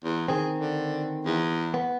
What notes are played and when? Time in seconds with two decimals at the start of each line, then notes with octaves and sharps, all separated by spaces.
0.04 E2
0.28 D#3 C4 G#4
0.59 D3
1.25 E2
1.74 B3